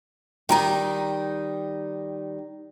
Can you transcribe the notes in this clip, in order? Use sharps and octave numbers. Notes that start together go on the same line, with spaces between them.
D#3 G3 D#4 G5 A#5